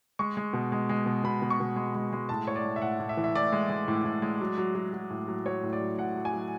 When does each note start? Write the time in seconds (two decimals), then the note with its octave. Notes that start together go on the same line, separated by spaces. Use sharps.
0.19 G#3 C#6
0.37 G#3
0.53 B2
0.72 G#3
0.89 G#3
1.06 B2
1.24 B2 B5
1.42 B2
1.50 C#6
1.60 B2
1.76 G#3
1.95 G#3
2.13 G#3
2.29 A2 A5
2.46 A2 C#5
2.56 D5
2.64 G#3
2.76 E5
2.82 A2 F#5
2.99 A2
3.09 E5
3.17 E3
3.24 E5
3.35 A2 D5
3.52 G#3
3.69 G#3
3.88 A2
4.05 A2
4.22 G#3
4.41 F#3
4.58 F#3
4.75 F#3
4.93 F#3
5.10 A2
5.28 F#3
5.46 F#3 C#5
5.63 A2
5.73 D5
5.81 F#3
5.98 A2 F#5
6.16 F#3
6.25 G#5
6.33 F#3